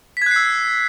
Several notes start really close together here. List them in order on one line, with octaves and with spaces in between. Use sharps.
B6 G#6 F#6 C7 E6